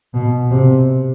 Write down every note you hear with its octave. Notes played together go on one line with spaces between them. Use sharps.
B2
C3